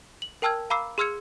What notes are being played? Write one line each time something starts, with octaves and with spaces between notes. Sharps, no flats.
F#7
A#4 G5 A5 E6 F6 G#6
F5 A#5 B5 D6 E6 C7
G#4 C6 E6 F6 G#6 C#7